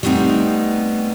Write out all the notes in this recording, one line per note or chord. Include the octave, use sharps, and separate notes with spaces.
G3 A3 B3 C4 D#4